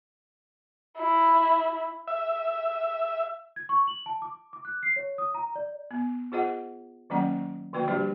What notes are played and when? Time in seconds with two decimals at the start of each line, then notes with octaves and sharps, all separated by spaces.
0.97 E4
2.08 E5
3.56 G#6
3.69 C#6
3.88 F#7
4.06 A5
4.22 D6
4.53 D6
4.65 F#6
4.83 C7
4.96 C#5
5.18 D#6
5.35 A#5
5.56 D5
5.91 B3
6.32 F4 G#4 C5 D#5 F#5
7.10 D#3 F#3 A#3 C#4 D5 F#5
7.73 D3 F3 A#3 F#4 B4 G5
7.88 G3 D4 F#4 G4 C5 D5